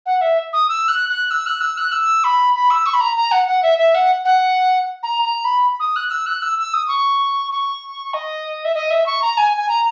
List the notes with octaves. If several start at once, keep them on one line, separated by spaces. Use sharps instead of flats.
F#5
E5
D#6
E6
F#6
F#6
E6
F#6
E6
F#6
E6
B5
B5
E6
C#6
B5
A#5
A#5
F#5
F#5
E5
E5
F#5
F#5
A#5
A#5
B5
D#6
F#6
E6
F#6
E6
E6
D#6
C#6
C#6
D#5
E5
D#5
E5
C#6
A#5
G#5
G#5
A#5